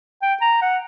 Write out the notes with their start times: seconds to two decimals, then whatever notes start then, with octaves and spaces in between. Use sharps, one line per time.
0.22 G5
0.41 A#5
0.62 F#5